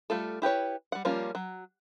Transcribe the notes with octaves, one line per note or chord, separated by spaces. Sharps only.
G3 A3 F4 A4
E4 G4 B4 C#5
G3 F#5
F3 G3 A#3 C#4 F4
F#3